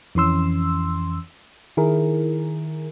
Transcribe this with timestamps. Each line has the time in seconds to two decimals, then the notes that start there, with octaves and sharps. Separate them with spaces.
0.15 F2 E3 C#4 C6 E6
1.77 D#3 E4 G#4 A#4